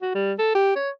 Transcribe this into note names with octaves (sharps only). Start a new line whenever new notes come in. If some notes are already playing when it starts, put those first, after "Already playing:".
F#4
G3
A4
G4
C#5